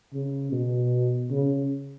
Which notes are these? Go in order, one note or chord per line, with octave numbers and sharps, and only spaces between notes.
C#3
B2
C#3